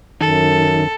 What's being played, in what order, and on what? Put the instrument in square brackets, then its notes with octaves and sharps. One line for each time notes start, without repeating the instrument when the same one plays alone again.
[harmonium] F#2 [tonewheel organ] D#3 [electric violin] A4